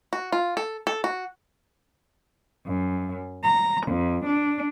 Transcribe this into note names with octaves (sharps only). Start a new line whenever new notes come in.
F#4
F4
A4
A4
F#4
F#2
A#5
F2
D4